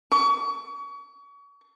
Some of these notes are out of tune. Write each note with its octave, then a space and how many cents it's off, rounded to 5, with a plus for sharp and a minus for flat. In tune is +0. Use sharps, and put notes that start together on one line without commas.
C#6 +35